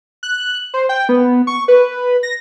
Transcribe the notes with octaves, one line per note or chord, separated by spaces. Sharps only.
F#6
C5
G5
B3
C#6
B4
A#6